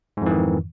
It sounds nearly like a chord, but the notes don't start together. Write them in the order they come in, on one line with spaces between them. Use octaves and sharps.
G#2 F2 E3 D#3